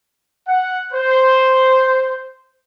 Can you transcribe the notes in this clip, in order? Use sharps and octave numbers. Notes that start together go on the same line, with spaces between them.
F#5
C5